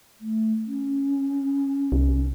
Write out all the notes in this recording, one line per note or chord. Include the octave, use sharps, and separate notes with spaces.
A3
C#4
C2